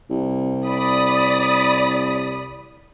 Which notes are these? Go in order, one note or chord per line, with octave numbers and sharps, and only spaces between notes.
C2
D5 B5 D#6